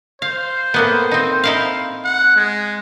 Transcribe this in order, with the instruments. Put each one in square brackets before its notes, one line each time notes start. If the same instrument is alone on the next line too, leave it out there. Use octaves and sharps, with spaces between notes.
[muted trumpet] C5 [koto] F5
[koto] A2 A#3 B3
C4 D#4
D#4 E4 F5
[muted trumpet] F#5
G#3